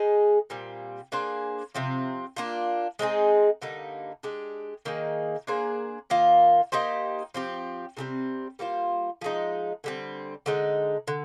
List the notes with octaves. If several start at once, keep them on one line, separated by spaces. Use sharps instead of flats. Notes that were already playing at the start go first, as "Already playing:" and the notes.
Already playing: G#3 D#4 G#4
A#2 G3 C4
A#3 D4 G#4 C5
C3 F3 C4
A#3 D4 F4
G#3 C4 D#4 G#4
D3 G3 A#3 D#4
G#3 D4 G4
D#3 A#3 D#4 G#4
A#3 D4 G#4 C5
D#3 A#3 F4
A#3 D#4 G4 C5
F3 C4 G4
C3 D#3 G3 C4
G3 A#3 F4 C5
F3 G#3 D#4
D3 G3 C4
D3 G#3 D#4
D3